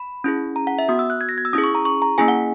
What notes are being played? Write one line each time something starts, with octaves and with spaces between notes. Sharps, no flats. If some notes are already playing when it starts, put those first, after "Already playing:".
Already playing: B5
C#4 E4 G#4
A#5
F#5
E5
B3 F#4 D#6
E6
F#6
G#6
A#6
G#6
E6
C#4 E4 G#4 D#6
C#6
A#5
C#6
A#5
A#3 C#4 E4 G#4 G#5
F#5